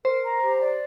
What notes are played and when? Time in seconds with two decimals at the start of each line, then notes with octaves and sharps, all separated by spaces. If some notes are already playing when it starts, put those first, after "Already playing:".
0.05 A#4 C5
0.24 A#5
0.42 G4
0.60 D5